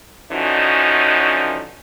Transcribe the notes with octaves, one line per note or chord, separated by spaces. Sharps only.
D3 E3 F3 C#4 D#4 F#4